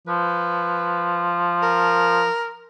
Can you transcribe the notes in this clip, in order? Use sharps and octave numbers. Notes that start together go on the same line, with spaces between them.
F3 B4
A#4